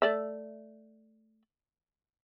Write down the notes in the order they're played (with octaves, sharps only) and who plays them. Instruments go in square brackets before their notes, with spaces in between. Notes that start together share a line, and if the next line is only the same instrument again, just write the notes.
[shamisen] A3 D5 E5